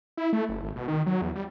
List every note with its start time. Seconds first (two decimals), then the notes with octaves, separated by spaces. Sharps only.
0.17 E4
0.33 A3
0.49 F#1
0.63 G#1
0.76 B2
0.88 D#3
1.07 F#3
1.22 E2
1.36 G3